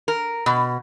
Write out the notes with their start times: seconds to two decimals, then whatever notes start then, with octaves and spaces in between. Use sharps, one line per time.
0.08 A#4
0.46 B2